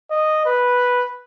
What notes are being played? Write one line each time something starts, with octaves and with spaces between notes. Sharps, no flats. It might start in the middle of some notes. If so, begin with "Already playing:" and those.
D#5
B4